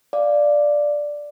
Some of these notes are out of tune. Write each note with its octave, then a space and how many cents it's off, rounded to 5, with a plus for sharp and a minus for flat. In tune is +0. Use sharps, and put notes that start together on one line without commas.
D5 +0 F5 +0